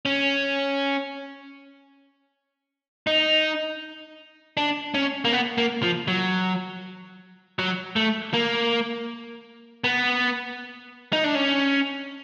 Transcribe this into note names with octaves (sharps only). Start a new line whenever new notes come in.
C#4
D#4
D4
C#4
A#3
B3
A#3
F3
F#3
F#3
A3
A#3
B3
D#4
D4
C#4